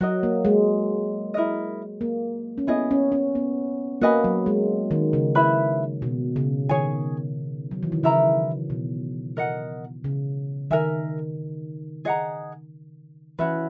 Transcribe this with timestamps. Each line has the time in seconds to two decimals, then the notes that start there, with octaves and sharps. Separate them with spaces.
0.01 F#3 F#4 A#4 D#5
0.23 A#3
0.45 G#3
1.34 E4 A#4 D#5
2.01 A#3
2.58 C#4
2.67 B3 E4 G#4 D#5
2.91 C#4
3.12 C#4
3.35 B3
4.01 A#3 F#4 B4 D#5 G#5
4.24 F#3
4.46 G#3
4.91 D#3
5.13 C#3
5.35 E4 B4 E5 B5
6.02 B2
6.36 C#3
6.69 D#3 G#4 C#5 G#5
7.71 F#3
7.83 E3
7.92 D#3
8.03 C#3 E4 A#4 E5 A#5
8.70 B2
9.37 A#4 D#5 F#5
10.04 C#3
10.71 D#3 A#4 E5 G#5
12.05 G#4 D#5 F#5 A#5
13.39 E3 C#4 F#4 B4 E5